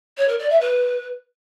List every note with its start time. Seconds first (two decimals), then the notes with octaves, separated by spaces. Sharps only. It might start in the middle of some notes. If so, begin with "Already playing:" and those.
0.17 C#5
0.28 A#4
0.39 D5
0.50 E5
0.61 B4